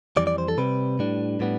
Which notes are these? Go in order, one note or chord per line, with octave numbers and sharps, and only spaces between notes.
F2 E3 G3 D5
D5
C5
A4
C3 G3 C4 B4
A2 G3 D4
A2 G3 B3 D4